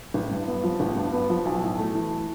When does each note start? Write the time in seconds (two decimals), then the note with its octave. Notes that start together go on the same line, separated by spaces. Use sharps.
0.14 A1
0.31 G2
0.48 B3
0.64 F3
0.80 A1
0.97 G2
1.13 B3
1.30 F3
1.45 B1
1.63 A2
1.78 A3
1.95 E3